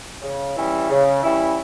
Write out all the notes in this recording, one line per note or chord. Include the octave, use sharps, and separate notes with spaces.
C#3
E3 G3 C#4 E4
C#3
E3 G3 C#4 E4